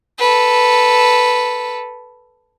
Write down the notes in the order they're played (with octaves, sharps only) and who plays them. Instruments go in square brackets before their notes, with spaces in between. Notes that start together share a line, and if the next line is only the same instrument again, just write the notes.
[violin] A4 B4